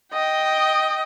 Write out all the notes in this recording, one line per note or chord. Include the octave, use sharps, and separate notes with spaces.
D#5 G5